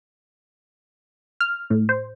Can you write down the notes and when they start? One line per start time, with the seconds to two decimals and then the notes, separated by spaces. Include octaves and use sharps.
1.40 F6
1.70 A2
1.89 C5